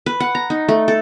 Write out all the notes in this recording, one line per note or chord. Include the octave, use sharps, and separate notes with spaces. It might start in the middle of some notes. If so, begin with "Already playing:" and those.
B4
F#5
A#5
D#4
A3
A4